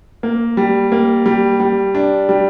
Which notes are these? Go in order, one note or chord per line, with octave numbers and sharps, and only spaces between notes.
A#3
G3
A#3
G3
G3
D4
G3